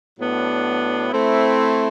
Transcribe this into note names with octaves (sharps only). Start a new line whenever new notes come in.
A2 F#3 B3 D4
A3 C4 E4